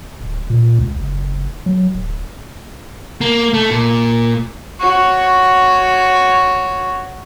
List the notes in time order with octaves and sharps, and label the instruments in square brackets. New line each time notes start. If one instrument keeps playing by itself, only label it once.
[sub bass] D1
A#2
C#2
F#1
F#3
D1
[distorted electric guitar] A#3
A3
A#2
[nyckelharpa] F#4 C#5